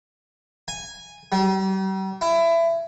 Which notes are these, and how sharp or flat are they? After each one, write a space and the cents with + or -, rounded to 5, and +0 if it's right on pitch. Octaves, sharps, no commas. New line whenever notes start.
G#5 -10
G3 -40
E4 +20